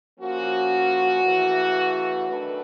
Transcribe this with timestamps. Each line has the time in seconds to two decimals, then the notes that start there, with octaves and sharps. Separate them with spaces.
0.20 F3 A#3 C#4 F#4
1.24 C#3 E3 A3
2.28 D#3 F#3 A3 D4 B4